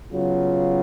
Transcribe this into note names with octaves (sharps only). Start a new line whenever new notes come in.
C#3 F#3 B3 F4